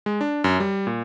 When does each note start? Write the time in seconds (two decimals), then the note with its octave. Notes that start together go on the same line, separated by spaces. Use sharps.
0.06 G#3
0.21 D4
0.44 F#2
0.60 G3
0.87 A#2